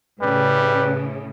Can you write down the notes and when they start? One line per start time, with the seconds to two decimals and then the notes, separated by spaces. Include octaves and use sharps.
0.21 A2 C#3 G3 B4